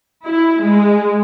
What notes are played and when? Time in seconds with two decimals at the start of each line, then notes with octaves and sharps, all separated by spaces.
0.24 E4
0.61 G#3